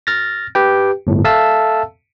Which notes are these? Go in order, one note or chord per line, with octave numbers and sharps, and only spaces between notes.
F6 A6 A#6
G4 B4 G5
G1 A2
A4 E5 F5 A5 E6